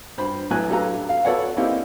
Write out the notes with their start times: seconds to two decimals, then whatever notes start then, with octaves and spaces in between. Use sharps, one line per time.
0.18 G2 C5 B5
0.50 A2 F#3 B3 B4 G#5 F#6
0.69 D4 G4 A4 B4 F5 A#5
1.09 F5
1.25 B3 A4 B4 C#5 D5 F#5
1.57 A#3 C4 D#4 E4 G4 F5